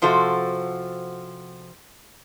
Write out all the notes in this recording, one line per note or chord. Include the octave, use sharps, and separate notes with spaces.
C3 F3 F#4 A4